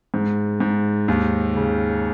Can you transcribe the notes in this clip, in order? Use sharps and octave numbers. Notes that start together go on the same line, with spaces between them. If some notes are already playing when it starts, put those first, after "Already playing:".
G#2
G#2
D#2
C#3